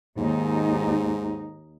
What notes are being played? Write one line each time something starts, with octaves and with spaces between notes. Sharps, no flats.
D#2 G#2 D#4